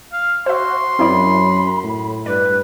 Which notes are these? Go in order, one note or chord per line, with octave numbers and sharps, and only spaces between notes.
F5
F#4 C5 E5 C6
F#2 C4 E4 D5 B5
A2
G2 B4 D5